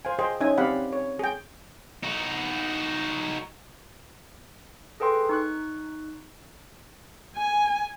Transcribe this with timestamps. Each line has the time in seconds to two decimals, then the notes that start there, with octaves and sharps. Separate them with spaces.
0.05 C5 F5 G#5
0.19 G#4 C5 D#5 G5
0.40 C#4 D#4 E5 G#5
0.58 C4 G4 D5 F5 F#5 B5
0.93 C#5
1.19 G#4 G5
2.03 D#4 F#4
5.00 G#4 A4 B4 G5 C6
5.29 D#4 C#6 F#6
7.36 G#5